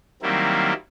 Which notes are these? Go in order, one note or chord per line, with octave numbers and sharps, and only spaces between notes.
D#3 F#3 G3 A#3 C4 E4